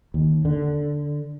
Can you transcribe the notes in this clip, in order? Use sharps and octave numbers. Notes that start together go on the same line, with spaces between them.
D#2
D3